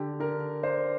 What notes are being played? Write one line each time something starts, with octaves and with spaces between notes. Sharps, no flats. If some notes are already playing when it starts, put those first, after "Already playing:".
Already playing: D3 G4
D3 A#4
D4 C5